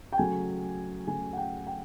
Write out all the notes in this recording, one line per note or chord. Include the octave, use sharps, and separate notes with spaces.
G5
C#3 F#3 A3 G#5
C#3 F#3 A3 G#5
F#5
G5
G5